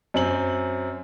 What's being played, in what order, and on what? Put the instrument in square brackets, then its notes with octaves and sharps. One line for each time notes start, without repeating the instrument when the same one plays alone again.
[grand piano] F#2 C4 F#7